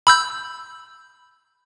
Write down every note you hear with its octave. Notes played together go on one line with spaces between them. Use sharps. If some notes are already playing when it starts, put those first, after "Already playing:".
B5 E6 G6